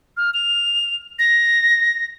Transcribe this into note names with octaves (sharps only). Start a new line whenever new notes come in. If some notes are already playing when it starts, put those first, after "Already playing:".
F6
F7
A#6